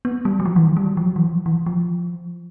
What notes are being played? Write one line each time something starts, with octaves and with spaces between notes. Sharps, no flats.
B3
G3
F#3
F3
E3
D#3
G3
F#3
F3
F#3
E3
F3
E3
F3